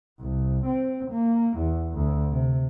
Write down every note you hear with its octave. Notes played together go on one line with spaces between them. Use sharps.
C2
C4
A#3
E2
D2
C3